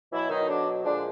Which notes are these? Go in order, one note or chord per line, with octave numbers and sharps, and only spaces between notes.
B2 E3 F#3 E4
D#3 D#4
D3 D4
A#2 D3 F3 G#3 D4